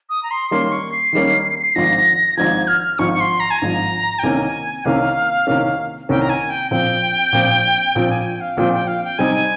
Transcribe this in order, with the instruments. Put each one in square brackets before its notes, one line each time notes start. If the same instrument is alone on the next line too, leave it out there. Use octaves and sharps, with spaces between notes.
[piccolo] D#6
A#5
C6
[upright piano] D#3 G3 A#3 C#4 [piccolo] C6
[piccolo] C#6
C7
[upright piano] D#3 G3 A#3 C#4
[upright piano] G#1 G#2 F3 [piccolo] A#6
[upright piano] G#1 G#2 F3 [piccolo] G#6
[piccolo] F6
[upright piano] G#1 G#2 F3 [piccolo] C#6
[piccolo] C#6
C6
A#5
G#5
[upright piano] G#1 G#2 F3 [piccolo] A#5
[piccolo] G5
[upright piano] C2 C3 D#3 A#3 C#4 [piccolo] G#5
[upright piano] C2 C3 D#3 A#3 C#4 [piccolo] F5
[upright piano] C2 C3 D#3 A#3 C#4
[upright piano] C2 C3 D#3 A#3 C#4 [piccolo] G5
[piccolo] A#5
G#5
G5
[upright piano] A#1 A#2 F3 C4 [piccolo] G5
[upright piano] A#1 A#2 F3 C4
[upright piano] A#1 A#2 F3 C4 [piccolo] G5
[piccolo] G#5
G5
F5
[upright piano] A#1 A#2 F3 C4 [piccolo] G5
[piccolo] G5
F5
G5
[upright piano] C3 G3 C4 D#4 [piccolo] G#5